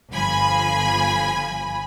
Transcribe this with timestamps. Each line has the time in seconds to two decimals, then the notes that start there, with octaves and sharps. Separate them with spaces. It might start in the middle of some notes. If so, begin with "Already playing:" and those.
0.12 G1 F3 G#5 B5